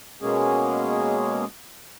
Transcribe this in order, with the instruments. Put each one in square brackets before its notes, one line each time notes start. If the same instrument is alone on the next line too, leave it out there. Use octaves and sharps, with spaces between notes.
[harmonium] B2 G#3 A#3 C#4 G#4